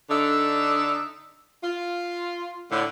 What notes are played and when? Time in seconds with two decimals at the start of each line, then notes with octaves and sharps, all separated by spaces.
0.10 D3 D4 D#4 A4 E5
1.63 F4
2.72 A2 D3